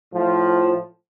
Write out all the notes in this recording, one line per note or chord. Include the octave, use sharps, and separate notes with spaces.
A2 F3